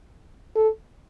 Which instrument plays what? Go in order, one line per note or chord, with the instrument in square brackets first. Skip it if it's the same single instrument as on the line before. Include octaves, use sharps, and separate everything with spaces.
[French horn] A4